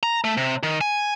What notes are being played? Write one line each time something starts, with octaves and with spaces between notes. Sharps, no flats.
A#5
A3
C3
D#3
G#5